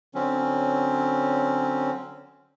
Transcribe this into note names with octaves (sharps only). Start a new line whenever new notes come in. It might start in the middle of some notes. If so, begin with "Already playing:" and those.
D3 F#3 C4 C#4